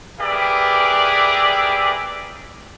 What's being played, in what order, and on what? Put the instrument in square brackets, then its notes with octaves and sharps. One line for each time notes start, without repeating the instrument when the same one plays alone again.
[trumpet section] G4 G#4 A#4 B4 D5 E5